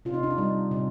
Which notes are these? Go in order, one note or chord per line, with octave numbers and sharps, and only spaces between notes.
C3 F4
D#4
D4
D#4
G3
C3